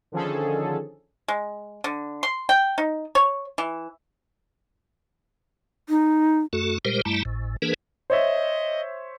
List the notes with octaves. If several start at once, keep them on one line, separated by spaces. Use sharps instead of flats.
D3 D#3 F3 C#4 G#4 A4
G#3
D3
C6
G5
D#4
C#5
E3
D#4
F#2 A3 F#4 A4
A#2 G3 G#3 G4 A#4 C5
G2 G3 A3 E4 A5 A#5
G#1 A2
E3 A#3 D4 G#4 A#4 B4
C5 C#5 D#5 E5